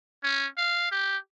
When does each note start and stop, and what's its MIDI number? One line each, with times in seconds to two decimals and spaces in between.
0.23 0.47 61
0.57 0.87 77
0.91 1.17 67